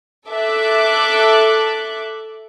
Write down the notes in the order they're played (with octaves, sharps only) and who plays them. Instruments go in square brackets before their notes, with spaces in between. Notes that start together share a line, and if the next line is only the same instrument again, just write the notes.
[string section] A4 E5 D6 F#6